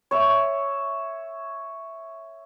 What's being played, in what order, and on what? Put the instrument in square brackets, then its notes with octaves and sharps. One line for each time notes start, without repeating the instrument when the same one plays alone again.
[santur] C#5 E5